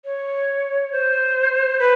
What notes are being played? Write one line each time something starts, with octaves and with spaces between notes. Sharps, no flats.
C#5
C5
B4